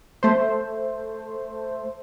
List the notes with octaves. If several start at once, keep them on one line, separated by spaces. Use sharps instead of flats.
A3 C5